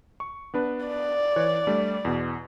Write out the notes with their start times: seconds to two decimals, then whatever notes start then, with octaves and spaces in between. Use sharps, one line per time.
0.20 C#6
0.54 B3 D4 B4
0.86 D5
1.36 E3 C#5 F#6
1.67 G3 A3 D4
2.05 E2 B2